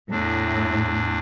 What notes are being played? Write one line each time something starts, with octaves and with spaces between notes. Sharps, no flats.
E2 A2 D4